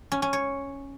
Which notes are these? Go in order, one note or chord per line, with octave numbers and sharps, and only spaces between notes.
C#4
C#4
C#5